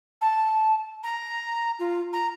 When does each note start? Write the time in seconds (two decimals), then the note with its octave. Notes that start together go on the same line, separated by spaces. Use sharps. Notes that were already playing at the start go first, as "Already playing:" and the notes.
0.21 A5
1.03 A#5
1.79 F4
2.13 A#5